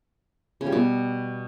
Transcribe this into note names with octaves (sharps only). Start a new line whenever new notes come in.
C#3
G3
B2